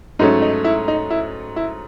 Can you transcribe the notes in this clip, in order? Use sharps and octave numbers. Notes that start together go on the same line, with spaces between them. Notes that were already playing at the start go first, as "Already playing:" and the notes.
G#2 F#3 A3 C#4 D#4
D#4
E4
D#4
E4
E4